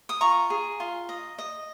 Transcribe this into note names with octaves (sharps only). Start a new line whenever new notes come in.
D#6
F4 A#5 C#6
G#4
F4
D#5
D#5